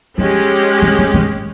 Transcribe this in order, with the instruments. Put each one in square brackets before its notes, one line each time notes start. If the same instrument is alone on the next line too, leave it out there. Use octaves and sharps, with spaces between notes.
[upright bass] F3 [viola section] G#3 C#4 G4
[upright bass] D#3
F3
D#3